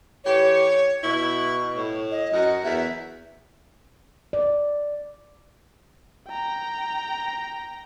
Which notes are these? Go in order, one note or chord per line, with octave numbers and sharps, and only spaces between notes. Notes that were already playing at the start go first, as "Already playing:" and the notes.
A2 E3 G4 C#5
B2 E4 C#6
A2
D#5
F#2 F#4 A#4 D#5
E2 E5
D5
G5 A#5